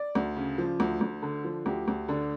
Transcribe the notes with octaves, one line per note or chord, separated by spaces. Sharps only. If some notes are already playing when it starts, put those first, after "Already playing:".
Already playing: D5
D2
C#3
F3
D2
D2
D3
F3
D2 G4
D2
D3 D4